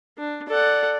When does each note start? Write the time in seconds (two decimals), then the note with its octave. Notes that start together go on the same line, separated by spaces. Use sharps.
0.18 D4
0.49 A4 D5 F#5